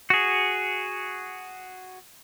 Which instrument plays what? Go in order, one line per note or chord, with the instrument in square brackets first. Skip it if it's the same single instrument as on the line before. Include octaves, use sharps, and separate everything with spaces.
[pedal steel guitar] F#4 G#4